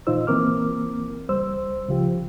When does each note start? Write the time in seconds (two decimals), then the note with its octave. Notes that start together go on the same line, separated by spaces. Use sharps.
0.07 A#2 E3 D#4 F4 C5 E6
0.27 E3 A#3 C4 A#4 D6 F6
1.29 C#2 G3 C5 E6
1.88 C#3 F3 F4 G4